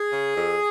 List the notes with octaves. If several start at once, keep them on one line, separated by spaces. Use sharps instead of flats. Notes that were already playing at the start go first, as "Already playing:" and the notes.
Already playing: G#4
C#3
F2